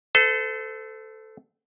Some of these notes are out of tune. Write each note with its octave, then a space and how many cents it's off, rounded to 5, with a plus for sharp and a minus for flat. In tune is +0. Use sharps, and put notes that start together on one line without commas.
A4 +0 C5 -40